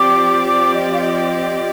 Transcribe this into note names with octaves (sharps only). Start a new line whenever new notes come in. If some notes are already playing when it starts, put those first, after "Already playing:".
Already playing: F3 C4 G4 D5 D6
D6
D#5
F5
D#5